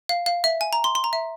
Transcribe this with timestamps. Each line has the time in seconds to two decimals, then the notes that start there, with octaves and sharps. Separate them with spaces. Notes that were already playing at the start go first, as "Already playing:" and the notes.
0.09 F5
0.26 F5
0.44 E5
0.61 G#5
0.73 A#5
0.84 C6
0.95 C6
1.04 A#5
1.13 E5